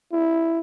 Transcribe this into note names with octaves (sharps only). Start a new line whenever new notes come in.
E4